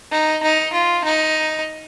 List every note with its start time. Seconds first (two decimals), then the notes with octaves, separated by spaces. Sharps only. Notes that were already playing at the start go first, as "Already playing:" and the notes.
0.12 D#4
0.43 D#4
0.73 F4
1.04 D#4